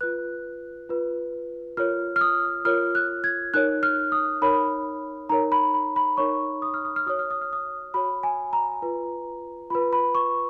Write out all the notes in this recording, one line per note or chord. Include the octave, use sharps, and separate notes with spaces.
F4 B4 F#6
F4 B4
F4 A#4 C#5 F6
F6
D#6
F4 A#4 C#5 F6
F#6
G#6
D#4 A#4 C#5 F#6
F6
D#6
D#4 A#4 C#5 B5
D#4 A#4 C#5 A#5
B5
B5
B5
D#4 A#4 C#5 C#6
D#6
F6
D#6
F6
F#4 C#5 D#6
F6
D#6
F6
D#6
F#4 C#5 B5
G#5
A#5
F4 B4
F4 B4 B5
B5
C#6